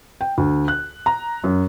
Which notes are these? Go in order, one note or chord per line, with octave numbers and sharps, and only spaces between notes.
G5
D2
F#6
A#5
F#2